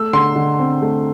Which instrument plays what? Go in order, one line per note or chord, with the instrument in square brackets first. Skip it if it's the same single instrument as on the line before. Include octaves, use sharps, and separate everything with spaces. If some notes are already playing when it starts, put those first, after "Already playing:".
Already playing: [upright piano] A3 E6
D3 C6
D3
C4
A3